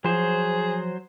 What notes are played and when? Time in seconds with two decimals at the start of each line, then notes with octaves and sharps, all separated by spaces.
0.04 F3 F#3 G#4 C5